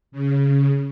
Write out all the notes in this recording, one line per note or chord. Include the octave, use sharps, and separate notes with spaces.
C#3